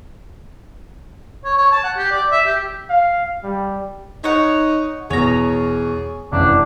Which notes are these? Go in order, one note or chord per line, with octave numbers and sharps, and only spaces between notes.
C#5
C#5
A5
F#5
G4
D5
E5
G4
F5
G3
D#4 C#5 F#5
E2 B2 G#4 C#5 A#5
F1 C#3 E3 D4